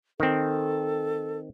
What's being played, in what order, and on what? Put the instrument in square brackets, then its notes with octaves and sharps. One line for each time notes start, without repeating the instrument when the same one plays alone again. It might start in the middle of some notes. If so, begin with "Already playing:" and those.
[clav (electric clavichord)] D#3 C4 [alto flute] A4